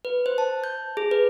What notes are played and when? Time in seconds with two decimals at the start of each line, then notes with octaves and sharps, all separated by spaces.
0.05 B4
0.26 C5
0.38 A5
0.64 G6
0.97 G#4
1.11 B4